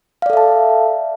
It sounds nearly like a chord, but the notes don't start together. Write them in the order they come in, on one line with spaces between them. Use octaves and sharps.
F5 D5 A4 E5 A5